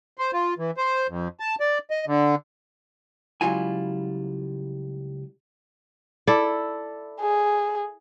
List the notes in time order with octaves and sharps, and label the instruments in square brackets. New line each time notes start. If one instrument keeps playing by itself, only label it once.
[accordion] C5
F4
E3
C5
F2
A5
D5
D#5
D3
[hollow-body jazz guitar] C#2 F#3 G3 E4 F4 G#5
[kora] E4 A4 D5
[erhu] G#4